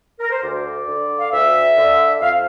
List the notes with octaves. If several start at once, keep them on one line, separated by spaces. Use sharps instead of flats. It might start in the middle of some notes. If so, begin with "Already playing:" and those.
A#4
C5
D2 D5
D3
F5
D2 E5
D3
F2 F5